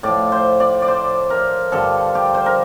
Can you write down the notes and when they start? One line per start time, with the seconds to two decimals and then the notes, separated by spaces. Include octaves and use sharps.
0.03 A2 F3 D5
0.32 C5
0.60 D5
0.82 D5
0.88 C5
1.30 A#4
1.72 G2 D3 F3 A4
2.15 G4
2.34 C5
2.46 A#4